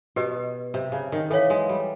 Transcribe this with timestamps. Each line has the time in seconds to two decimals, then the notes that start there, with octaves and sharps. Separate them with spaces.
0.16 B2 G4 B4 D#5
0.74 C3
0.92 C#3
1.12 D#3
1.30 E3 A4 C#5 F5
1.50 G#3
1.69 G3